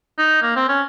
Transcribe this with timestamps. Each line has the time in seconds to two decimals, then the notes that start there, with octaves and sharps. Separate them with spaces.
0.18 D#4
0.42 A#3
0.56 C4
0.69 C#4